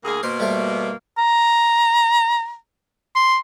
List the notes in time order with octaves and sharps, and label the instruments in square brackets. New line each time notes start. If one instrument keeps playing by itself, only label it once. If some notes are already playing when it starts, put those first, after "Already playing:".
[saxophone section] D2 A#3 G#4
[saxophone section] B2 A#3 [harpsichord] C5 C6
[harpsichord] G3 A3 C5
[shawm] A#5
C6